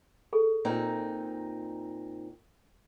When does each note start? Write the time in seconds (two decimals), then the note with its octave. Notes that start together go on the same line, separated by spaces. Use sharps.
0.33 G#4 A4
0.65 A#2 C4 D#4